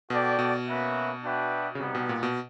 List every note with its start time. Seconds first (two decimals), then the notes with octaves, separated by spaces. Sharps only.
0.10 B2 F#4 A4 D5 G5
0.39 B2
0.67 A#3 C#4 F#4 B4 E5
1.23 D4 F#4 B4 E5 G5
1.75 C#3
1.80 C3 G3 B3 D#4
1.95 B2
2.09 A#2
2.23 B2